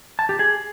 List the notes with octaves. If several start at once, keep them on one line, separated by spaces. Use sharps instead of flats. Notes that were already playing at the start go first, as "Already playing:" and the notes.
A5
G4
G#4